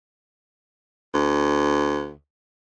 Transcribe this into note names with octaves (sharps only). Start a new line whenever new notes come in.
D2